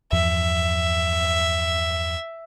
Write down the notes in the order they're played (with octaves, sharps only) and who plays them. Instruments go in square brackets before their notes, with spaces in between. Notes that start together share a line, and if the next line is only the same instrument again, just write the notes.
[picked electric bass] E2 G2 F3 [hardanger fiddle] E5